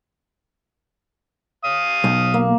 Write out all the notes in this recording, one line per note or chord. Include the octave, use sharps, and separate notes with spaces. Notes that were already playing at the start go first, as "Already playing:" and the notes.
F5 D#6
B1
A#3